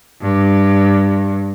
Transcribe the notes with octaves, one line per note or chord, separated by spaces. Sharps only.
G2